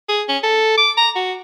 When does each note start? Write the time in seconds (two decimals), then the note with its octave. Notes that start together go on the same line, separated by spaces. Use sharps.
0.09 G#4
0.29 C#4
0.43 A4
0.78 D6
0.97 A#5
1.15 F#4